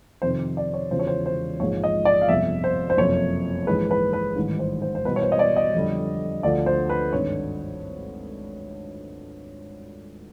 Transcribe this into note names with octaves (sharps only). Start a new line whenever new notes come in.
F2 C3 D#3 C5
D5
C#5
E1 E2 C#3 F3 C5
C#5
C5
C5
A#1 G#2 F3 G#3 C#5
D#5
D5
F5
G1 F2 C3 E5
C5
C5
F#1 F2 C3 C#5
A#1 G#2 E3 G#3 B4
B4
B4
A1 G#2 D#3 G3
C5
C5
C5
E1 E2 B2 G3 B4
C#5
C5
D#5
D5
D#5
F2 D3 G3
D2 D3 F3 D5
C5
B4
G#1 G2 D#3 C#5